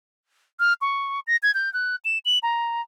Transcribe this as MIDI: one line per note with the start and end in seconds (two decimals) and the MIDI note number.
0.60 0.73 89
0.82 1.20 85
1.27 1.37 94
1.43 1.54 92
1.54 1.72 91
1.74 1.96 90
2.05 2.18 100
2.25 2.39 102
2.43 2.82 82